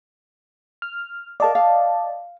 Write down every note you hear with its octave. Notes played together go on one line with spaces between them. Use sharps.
F6
A#4 D5 D#5 F5 A5
F5